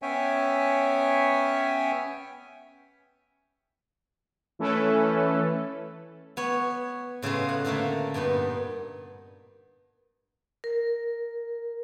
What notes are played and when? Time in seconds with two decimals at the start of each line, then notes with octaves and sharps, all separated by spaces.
0.02 B3 C#4 C#5 E5 G5 G#5
4.59 E3 A3 C#4 E4 A4 B4
6.37 B3 C#5
7.22 A2 C#3 G#3 B3 F4
7.49 F#5
7.65 A2 D3 A3 A#3
8.14 G2 A#2 B3 D#4
10.64 A#4